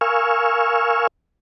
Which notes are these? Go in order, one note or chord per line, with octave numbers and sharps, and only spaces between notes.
A#4 F5 G#5 C#6 E6 F6